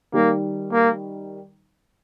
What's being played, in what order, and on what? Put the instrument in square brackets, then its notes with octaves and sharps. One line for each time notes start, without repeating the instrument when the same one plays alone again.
[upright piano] D#3 G3 [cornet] A#3
[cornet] A#3